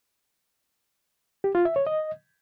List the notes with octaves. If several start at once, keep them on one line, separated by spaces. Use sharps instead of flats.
G4
F4
E5
C#5
D#5